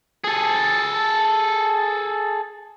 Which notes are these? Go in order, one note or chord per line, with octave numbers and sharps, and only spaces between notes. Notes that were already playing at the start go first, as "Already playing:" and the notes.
G#4 A4